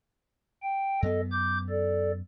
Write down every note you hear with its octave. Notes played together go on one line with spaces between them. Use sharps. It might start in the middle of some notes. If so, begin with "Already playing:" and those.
G5
F#2 B3 A4 D#5
D6 G6
A4 D5